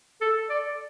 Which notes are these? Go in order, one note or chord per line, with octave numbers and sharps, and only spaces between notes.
A4
D5